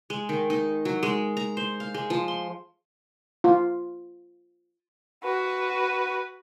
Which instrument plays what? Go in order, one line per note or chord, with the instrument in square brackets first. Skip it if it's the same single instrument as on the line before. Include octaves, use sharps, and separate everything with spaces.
[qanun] G#3
D#3
D#4
F#3
G#3
A#5
C5
F5
G#3
F3
C6
[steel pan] F4
[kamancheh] F#4 B4